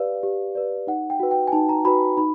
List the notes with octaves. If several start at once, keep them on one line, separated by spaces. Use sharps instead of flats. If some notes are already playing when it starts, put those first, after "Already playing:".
Already playing: G4 B4 D5 F5
G4
B4 D5
D#4 F#5
G5
F#4 B4
G5
G#5
D#4 A5
A#5
F#4 B4 B5
D#4 B5